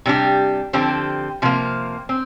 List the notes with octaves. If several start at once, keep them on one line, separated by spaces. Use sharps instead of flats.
C3 G3 D4 G4
D3 F3 C4 G4
C3 F3 A#3
C4